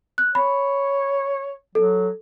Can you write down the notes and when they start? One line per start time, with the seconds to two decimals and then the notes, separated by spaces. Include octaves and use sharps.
0.18 F#6
0.35 C#5 B5
1.75 F#3 A4